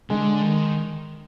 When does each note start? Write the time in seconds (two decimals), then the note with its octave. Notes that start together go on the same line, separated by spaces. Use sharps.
0.10 D3 G#3
0.42 D#3